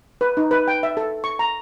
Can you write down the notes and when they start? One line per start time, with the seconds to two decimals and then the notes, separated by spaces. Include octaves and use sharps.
0.21 B4
0.37 D#4
0.51 B4
0.68 G5
0.83 E5
0.97 A4
1.24 C#6
1.39 A#5